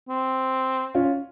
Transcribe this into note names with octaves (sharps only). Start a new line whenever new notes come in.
C4
C#4 F4